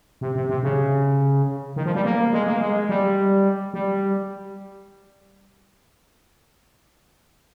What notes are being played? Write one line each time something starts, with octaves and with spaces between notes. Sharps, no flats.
C3
C3
C3
C#3
D#3
F3
G3
A#3
G#3
A#3
G#3
G3
G3